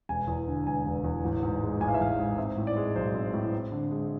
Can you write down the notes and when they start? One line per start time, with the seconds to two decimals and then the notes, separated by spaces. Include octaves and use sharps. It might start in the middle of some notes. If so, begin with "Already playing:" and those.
0.09 E1 G#5
0.28 E2
0.47 D3
0.66 E1 G#5
0.85 E1
1.04 E2
1.24 A1
1.43 G#2
1.62 G#3
1.80 A1 G#5
1.88 F5
1.94 E5
2.00 A1 F5
2.19 G#2
2.38 C4 E5
2.57 A2
2.67 D5
2.76 G#3
2.96 B1 C5
3.14 C4
3.34 A2
3.52 C4
3.72 D3
3.91 G#3